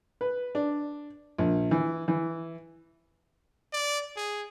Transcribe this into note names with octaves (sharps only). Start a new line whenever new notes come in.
B4
D4
A#1
E3
E3
D5
G#4